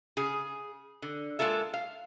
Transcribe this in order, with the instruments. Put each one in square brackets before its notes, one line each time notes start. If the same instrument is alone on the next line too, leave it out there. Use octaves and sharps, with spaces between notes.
[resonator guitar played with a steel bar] C#3 G#4
D3
G#3 A#3 F4 A4 E5
F5